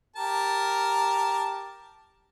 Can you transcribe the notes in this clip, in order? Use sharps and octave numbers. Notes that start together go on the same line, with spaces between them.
G4 A#4 A5